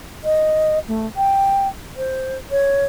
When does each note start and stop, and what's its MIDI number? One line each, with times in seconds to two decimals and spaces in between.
0.24 0.79 75
0.88 1.06 57
1.17 1.68 79
1.97 2.37 72
2.51 2.85 73